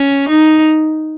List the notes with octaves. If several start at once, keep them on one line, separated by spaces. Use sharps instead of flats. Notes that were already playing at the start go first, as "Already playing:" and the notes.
Already playing: C#4
D#4